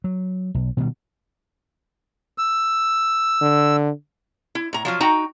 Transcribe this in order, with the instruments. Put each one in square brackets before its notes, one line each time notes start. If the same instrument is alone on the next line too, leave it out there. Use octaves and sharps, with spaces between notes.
[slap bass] F#3
B1
B2 D#3 G3
[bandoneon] E6
[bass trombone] D3
[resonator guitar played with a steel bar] E4
A2 A#5
F3 F#3 F4
D#4 F#4 G5 A#5